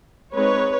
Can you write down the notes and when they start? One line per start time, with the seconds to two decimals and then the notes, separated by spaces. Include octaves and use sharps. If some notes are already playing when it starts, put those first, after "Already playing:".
0.34 G#3 C4 D#4 B4 C#5